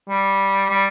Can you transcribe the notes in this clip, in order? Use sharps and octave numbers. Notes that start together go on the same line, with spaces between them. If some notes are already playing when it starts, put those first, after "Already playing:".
G3
G3